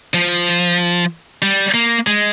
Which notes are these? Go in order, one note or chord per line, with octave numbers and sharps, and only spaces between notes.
F3
G3
A#3
G#3